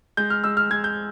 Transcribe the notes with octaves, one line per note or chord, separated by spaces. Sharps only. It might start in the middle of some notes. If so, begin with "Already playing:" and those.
G#3 G6
F6
G#3 E6
F6
G#3 G#6
G6